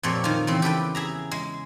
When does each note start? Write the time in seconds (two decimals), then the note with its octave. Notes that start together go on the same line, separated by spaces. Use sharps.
0.03 F2 A#2 C4 G4 C#5
0.24 D#3 F4
0.47 E2 C#3 C4
0.62 G4 A4 B4 G5
0.95 G#4 E5 A#5
1.31 G#3